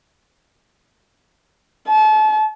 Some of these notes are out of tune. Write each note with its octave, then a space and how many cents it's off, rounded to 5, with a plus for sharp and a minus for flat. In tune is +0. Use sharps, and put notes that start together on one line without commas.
A5 -35